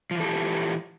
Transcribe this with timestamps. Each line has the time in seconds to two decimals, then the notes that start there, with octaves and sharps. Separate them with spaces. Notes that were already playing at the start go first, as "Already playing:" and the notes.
0.11 F3
0.15 E3
0.20 A4
0.24 G4